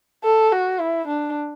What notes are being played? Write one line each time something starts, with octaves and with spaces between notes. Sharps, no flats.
A4
F#4
E4
D4